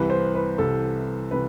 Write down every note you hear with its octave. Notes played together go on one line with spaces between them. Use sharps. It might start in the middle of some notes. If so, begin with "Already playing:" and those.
Already playing: C2 C3 E3 B4
C5
B4
C2 C3 E3 A4
C3 E3 B4